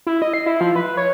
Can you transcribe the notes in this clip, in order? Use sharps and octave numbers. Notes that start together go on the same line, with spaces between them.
E4
D#5
C7
E4
F3
B4
C#5